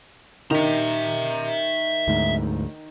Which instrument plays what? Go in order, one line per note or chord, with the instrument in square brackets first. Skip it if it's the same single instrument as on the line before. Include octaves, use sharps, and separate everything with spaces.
[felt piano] D#3 [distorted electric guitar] E5 A#5
[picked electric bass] D2 G#2